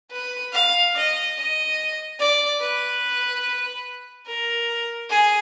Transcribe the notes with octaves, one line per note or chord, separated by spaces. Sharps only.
B4
F5
D#5
D#5
D5
B4
A#4
G#4